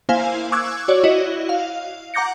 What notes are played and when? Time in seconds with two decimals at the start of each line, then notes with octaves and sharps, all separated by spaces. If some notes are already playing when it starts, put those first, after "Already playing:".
0.09 A#3 E4 C5 F5 G#5
0.52 C#6 D6 E6 F#6 G#6
0.88 F#4 C#5 D5
1.04 E4 F#4 D#5
1.49 F5
2.14 F#5 A#5 D6 G6 A#6 C#7